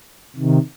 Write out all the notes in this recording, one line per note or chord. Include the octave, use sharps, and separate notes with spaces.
C3 D#3